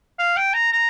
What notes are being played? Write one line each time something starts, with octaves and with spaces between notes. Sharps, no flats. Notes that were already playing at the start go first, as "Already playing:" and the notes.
F5
G5
A#5
A#5